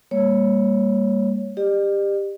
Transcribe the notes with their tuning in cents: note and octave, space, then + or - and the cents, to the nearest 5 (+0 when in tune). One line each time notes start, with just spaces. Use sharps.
G3 +35 A#3 +0 C#5 +0
G4 +15 D5 +45